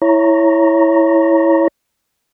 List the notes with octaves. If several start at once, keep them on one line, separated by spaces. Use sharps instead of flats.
E4 C#5 A#5